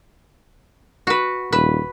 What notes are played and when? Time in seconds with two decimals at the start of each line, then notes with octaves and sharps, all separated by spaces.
1.07 F#4 B4
1.52 D#1 B4